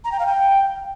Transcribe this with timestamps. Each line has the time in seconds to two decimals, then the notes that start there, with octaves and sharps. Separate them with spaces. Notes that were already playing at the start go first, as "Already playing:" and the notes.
0.04 A#5
0.12 G5
0.19 F5
0.27 G5